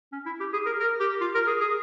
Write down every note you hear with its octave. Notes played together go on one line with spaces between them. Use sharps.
C#4
E4
G4
G#4
A#4
A#4
G4
F4
A#4
G#4
G#4